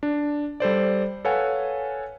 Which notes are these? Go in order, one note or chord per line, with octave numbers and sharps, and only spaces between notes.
D4
G3 A4 C5 D5
A4 B4 C#5 F5 F#5 G#5